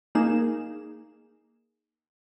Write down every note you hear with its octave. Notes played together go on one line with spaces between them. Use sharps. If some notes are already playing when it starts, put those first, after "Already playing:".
A#3 D#4 G#4 E7